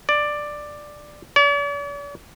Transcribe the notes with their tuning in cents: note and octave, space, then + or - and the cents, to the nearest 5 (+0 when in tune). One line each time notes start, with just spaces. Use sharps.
D5 +10
D5 -45